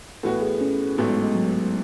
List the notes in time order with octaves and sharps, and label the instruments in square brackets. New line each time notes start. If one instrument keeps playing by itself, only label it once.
[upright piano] A2 E3 B3 F#4 [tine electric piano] A4
[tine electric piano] G#4
C#4
[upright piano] A1 G#2 F#3 A3 [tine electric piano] B3
[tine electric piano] G#3
G#3
F#3